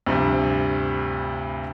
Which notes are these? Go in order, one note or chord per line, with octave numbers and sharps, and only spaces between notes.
D2 G2 C3 F3 G3